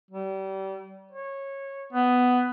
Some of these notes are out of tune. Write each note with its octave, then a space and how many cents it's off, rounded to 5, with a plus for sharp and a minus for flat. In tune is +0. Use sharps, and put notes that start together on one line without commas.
G3 -30
C#5 -20
B3 +10